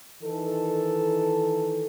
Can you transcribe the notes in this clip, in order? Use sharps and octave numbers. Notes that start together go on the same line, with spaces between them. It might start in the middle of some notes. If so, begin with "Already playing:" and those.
D#3 E3 A4